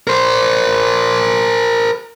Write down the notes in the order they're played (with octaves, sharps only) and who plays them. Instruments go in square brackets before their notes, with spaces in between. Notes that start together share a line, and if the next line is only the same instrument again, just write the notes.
[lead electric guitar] A#4 C5